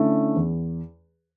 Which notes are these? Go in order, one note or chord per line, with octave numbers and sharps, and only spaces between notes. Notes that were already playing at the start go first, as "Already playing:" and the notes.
Already playing: D3 A3 C#4 E4
E2